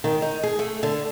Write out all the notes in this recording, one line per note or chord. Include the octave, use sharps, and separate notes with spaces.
D#3
D#4
G#4
A3
D3